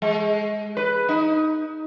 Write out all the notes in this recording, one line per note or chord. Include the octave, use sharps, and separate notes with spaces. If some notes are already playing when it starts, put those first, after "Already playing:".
G#3
B4
D#4